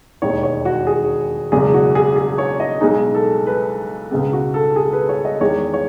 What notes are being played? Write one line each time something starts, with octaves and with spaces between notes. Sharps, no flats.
E1 D#2 D#3 G#3 D#4 C#5
C#5
F#4
G#4
F#1 E2 B2 G#3 G#4
F#4
G#4
G#4
C#5
D#5
B1 B2 G#3 D#4
A4
B4
C#2 B2 G#3 B3
F#4
A4
G#4
B4
C#5
D#5
E2 D#3 G#3 C#5
C#5